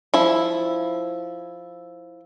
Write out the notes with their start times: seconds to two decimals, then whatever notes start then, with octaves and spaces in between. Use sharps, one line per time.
0.14 F3 E4